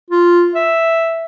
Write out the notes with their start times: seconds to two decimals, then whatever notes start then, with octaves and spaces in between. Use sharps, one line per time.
0.11 F4
0.55 E5